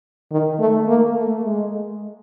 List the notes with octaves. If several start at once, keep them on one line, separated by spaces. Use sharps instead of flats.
D#3
A3
A#3
A3
G#3